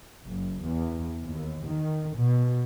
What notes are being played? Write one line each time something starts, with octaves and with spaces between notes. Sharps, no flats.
F#1
E2
D#2
D#3
B2